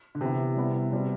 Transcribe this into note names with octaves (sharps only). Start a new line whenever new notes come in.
D3
C3 E3 B3 E4
G3 B3 E4
B2 G3 C4